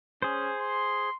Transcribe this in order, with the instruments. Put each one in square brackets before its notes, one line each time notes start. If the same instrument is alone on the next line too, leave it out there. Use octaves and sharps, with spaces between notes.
[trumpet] C#4 [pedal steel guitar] G#4 C5
[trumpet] C6